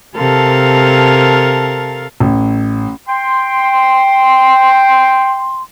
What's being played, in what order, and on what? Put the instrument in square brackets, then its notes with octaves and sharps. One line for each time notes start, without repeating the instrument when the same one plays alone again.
[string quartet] C3 A4 A#4 F5 A5
[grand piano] A1
[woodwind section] G5 C6